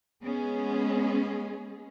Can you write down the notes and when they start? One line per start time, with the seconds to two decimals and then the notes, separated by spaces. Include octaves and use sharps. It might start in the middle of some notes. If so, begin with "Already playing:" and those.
0.24 G#3 B3 C#4 G#4